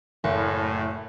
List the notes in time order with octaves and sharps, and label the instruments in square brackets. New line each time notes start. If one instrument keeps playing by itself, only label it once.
[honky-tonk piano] F#1 [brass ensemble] A2